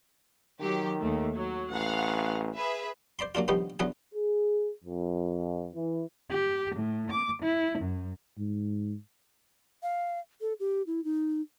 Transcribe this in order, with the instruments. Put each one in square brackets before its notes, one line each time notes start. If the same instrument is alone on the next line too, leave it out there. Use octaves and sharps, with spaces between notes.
[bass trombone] D#3 [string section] F#3 G4
[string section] D#2 A3
F#3
[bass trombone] A1 [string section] F5 F#5
[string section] G#4 B4 E5
[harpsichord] C5 D5 B5 C6
F#3 A#3 D4 F4
D3 D#3 F3 G3 B3 C#4
E2 D3 F#3 B4 G#5
[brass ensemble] G#4
F2
E3
[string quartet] G4
A2
D6
E4
F#2
[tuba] G#2
[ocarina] F5
A4
G4
E4
D#4